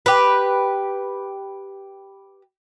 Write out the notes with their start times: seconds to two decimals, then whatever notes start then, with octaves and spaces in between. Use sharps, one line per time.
0.06 G4 B4